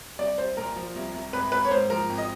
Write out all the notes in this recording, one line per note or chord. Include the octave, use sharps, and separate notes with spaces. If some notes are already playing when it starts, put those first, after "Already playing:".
C2 D5
C2 C5
A#2 A#4
F3
C2
C2
G#1 B4
A#3 B4
C#5
G#2 C5
F3 A#4
G#1
D#5